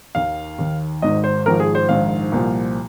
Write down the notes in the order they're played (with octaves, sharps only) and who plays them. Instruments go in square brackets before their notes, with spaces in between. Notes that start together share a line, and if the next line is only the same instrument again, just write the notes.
[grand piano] D#2 D#3 F5
D#2 D#3
G#1 G#2 D#3 D#5
C5
G#1 G#2 F3 A#4
G#4
C5
A#1 G#2 D#3 F5
C2 A#2 F3